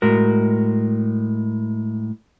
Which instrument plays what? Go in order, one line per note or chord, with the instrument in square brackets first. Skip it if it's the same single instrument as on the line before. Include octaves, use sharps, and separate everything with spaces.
[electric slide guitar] A2 G#3 F#4 A#4